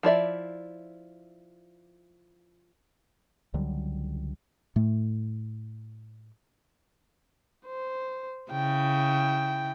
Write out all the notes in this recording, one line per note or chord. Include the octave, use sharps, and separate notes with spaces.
F3 E4 D5 E5
C#2 D3 F#3 G3
A2 A3
C5
C#3 E4 G5